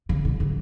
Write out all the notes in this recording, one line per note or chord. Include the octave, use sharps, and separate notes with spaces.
C#3
B2
C#3